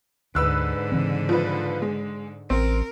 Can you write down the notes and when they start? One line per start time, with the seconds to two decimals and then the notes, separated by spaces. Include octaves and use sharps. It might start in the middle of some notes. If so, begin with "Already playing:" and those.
0.35 D2 G#2 D3 B4 E6 F#6
0.92 C#3 E3 C4
1.29 F3 B4
1.82 G#3
2.50 A1 C4 A#4